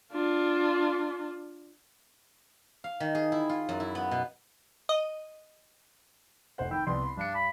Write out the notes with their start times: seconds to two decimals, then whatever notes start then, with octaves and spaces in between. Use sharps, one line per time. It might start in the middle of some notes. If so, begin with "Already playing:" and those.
0.13 D4 F4
2.84 F5
3.00 D#3
3.15 G#4
3.32 E4
3.49 F4
3.69 F#2
3.80 E4
3.95 B3
4.11 B2
4.89 D#5
6.58 F1 C5 F#5
6.71 D#3 G5 B5 E6
6.87 C2 B3 D5 C6
7.03 B5
7.17 G2 D4 C#7
7.35 B5